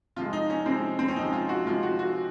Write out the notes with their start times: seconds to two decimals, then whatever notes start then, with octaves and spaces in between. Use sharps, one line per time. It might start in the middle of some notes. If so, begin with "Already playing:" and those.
0.16 C3 F3 G#3 F4
0.33 D#4
0.50 C#4
0.66 C3 F3 G#3 C4
0.99 C4
1.08 C#4
1.16 C3 F3 G#3 D#4
1.33 F4
1.49 F#4
1.66 C3 F3 G#3 F4
1.83 F#4
1.99 F#4